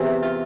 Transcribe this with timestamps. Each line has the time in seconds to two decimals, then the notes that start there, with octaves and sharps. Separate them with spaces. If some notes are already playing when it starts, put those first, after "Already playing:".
Already playing: E2 C3 E3
0.23 F4